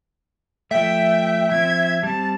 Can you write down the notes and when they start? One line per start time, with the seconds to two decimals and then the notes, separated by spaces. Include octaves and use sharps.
0.71 F3 A3 E5 G5
1.52 F3 C4 G#6
2.03 G3 C4 A5